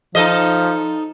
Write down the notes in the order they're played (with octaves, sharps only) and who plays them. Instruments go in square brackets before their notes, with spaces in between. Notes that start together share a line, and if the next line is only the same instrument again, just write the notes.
[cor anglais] F3 [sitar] D#4 A4 D#5